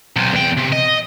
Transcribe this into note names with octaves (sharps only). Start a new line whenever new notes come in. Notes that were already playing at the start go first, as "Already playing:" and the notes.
B1 C3
E2 G5
C3
D#5